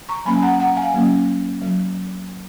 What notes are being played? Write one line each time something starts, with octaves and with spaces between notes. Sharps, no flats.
A#5 C#6
F#3 A#3 C#4 G#5 B5
F#5 A#5
F#5 A#5
F5 G#5
F#3 A#3 C#4
F#3